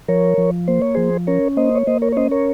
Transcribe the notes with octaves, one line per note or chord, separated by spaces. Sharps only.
F3 A#4 C#5
F3
A#3 C5
C#5
F3 G#4 C5
C#4 A#4 C#5
A#3 C5 D#5
C#5
A#3 C5 D#5
A#4 C#5
C#5
C#4 C5 D#5
A#4 C#5